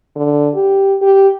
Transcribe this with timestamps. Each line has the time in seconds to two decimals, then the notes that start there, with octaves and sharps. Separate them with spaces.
0.16 D3
0.55 G4
1.02 G4